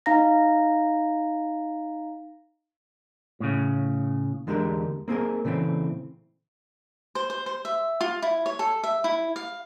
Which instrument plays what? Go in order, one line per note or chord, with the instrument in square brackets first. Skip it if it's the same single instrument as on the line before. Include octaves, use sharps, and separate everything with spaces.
[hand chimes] D#4 F5 A#5 A#6
[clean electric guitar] A2 C#3
[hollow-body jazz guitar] E2 D3 G#3 D4 G4 A#4
A#3 C4 E4 G#4 A#4
A#2 C#3 E3 A3 C4
[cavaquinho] C5
C5
C5
E5
F4
E4
C#5
A4
E5
E4
F5